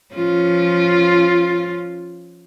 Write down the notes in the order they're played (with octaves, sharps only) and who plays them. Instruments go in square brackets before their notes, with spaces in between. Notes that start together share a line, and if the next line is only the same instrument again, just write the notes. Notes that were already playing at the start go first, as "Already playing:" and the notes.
[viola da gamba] F3 C#4 F4